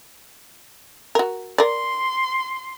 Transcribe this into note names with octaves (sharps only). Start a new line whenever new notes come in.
F#4 A#4
A#4 D5 C6